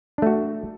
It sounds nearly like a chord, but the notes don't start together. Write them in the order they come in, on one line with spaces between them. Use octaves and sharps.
D4 A3 F#4